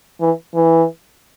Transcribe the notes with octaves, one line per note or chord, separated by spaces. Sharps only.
E3
E3